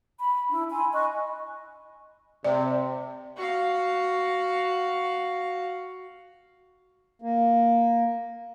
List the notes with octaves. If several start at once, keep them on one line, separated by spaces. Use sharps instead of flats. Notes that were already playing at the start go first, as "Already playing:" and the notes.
B5
D4 E4
G#5 B5 C6
D#5 C#6 F#6
C3 D5
F#4 F5
A#3